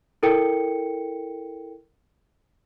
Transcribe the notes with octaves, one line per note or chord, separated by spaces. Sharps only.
E4 A4 A#4 G5 C#7